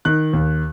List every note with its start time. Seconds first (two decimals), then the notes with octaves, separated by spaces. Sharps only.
0.05 D#3 F#6
0.33 D#2